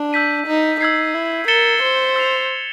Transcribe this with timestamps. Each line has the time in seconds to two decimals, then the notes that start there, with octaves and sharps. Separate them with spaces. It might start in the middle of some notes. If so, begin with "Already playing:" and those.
Already playing: D4
0.13 E6 G6 B6 D#7
0.46 D#4
0.80 D#4 E6 G#6 C7
1.14 E4
1.48 A#4 A6 C#7 E7 G7
1.82 C5
2.16 E6 A6 C7 F7